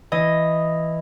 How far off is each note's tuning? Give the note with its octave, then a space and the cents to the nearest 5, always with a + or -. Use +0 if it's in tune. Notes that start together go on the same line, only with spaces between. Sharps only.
E3 +0 D#5 +0